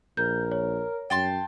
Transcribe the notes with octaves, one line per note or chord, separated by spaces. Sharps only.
A#1 A#4 G6
C#5
F#2 G5 A5 C6